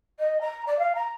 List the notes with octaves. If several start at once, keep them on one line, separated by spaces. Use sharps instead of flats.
D#5
A#5
D5
F5
A#5